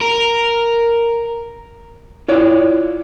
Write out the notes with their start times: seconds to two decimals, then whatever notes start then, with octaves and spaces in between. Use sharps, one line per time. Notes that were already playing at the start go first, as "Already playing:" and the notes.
0.01 A#4
2.28 E4 F4 C#5 D5